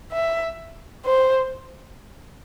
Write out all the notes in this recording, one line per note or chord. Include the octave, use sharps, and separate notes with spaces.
E5
C5